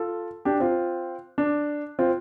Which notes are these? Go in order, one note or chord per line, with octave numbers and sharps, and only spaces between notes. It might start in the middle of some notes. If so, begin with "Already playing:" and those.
Already playing: F4 A4
D4 G4
C4 F4
D4
C4 F4